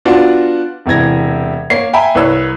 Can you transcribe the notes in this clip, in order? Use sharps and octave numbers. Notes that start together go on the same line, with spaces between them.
B3 D4 F4 F#4 F5 F#5
E1 C3 E3 G#6 A#6
A#3 C#5 C7
E5 G5 G#5 A#5 B5
C2 B4 C#5 E6